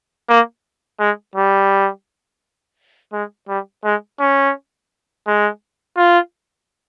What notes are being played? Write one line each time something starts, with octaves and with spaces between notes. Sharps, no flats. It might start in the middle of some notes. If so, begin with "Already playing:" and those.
A#3
G#3
G3
G#3
G3
G#3
C#4
G#3
F4